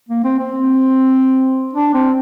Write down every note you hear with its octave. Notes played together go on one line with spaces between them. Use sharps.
A#3
C4
C4
D4
C4